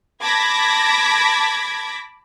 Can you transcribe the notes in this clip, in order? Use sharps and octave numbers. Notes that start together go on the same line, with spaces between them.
A5 B5 D6 G#6 A#6 B6